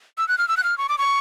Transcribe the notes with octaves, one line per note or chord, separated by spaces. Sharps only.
E6
F#6
F6
E6
F#6
F6
C#6
D6
C#6